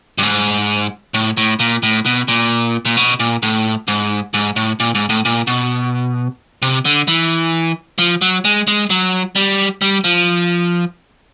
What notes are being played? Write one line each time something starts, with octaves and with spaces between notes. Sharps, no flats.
G2
G#2
A2
A2
A#2
A2
B2
A#2
A#2
B2
A#2
A2
G#2
G#2
A2
A#2
G#2
A2
A#2
B2
C3
D3
E3
F3
F#3
G#3
G#3
F#3
G3
G3
F3